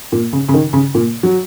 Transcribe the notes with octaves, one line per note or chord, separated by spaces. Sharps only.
A#2
C#3
C#3
D#3
C#3
A#2
F#3